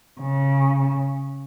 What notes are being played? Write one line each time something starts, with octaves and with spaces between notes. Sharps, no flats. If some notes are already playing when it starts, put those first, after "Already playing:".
C#3